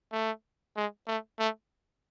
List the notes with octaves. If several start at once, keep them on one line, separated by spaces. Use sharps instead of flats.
A3
G#3
A3
A3